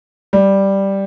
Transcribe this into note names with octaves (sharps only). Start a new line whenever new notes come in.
G3